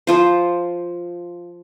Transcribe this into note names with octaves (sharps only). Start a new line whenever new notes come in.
F3 F4 C5